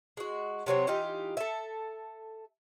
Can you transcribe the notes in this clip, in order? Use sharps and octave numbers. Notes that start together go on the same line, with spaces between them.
G#3 F#4
C3 F#3 C4 C#5
E3 D#4 F4 G4
A4 E5